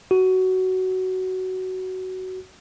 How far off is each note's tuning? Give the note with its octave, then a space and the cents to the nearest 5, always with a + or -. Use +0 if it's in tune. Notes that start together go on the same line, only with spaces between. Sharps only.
F#4 +15